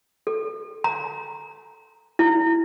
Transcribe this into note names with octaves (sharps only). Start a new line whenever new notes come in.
A4
A#5
E4